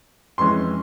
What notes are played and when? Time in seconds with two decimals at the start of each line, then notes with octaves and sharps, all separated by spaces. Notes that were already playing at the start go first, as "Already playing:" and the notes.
0.38 F2 E3 G#3 C#4 C6